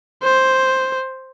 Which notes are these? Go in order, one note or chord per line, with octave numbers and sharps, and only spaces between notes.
C5